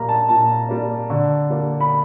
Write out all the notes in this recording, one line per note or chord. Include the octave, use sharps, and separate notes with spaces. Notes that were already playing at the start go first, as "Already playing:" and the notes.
Already playing: A#2 G3 A#3 A#5
A5
A#2 A5
G3 A#3
D3
G3 A#3
B5